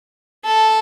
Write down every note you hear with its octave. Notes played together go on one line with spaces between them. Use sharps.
A4